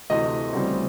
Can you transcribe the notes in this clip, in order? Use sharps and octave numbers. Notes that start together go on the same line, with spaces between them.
D2 C3 E3 A3 C4 D#5
D2 C#3 E3 G3 C4